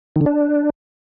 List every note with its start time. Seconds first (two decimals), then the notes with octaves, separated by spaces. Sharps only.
0.16 D#3
0.21 D3
0.26 D4